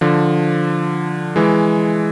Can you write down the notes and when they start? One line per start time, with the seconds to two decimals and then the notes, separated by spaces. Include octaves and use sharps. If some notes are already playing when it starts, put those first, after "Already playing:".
0.01 D3 F3
1.36 E3 G#3